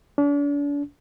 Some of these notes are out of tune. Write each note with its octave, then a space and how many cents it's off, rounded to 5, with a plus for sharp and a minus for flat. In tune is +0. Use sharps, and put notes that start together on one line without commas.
D4 -40